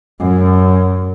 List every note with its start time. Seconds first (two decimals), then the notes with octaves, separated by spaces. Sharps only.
0.20 F#2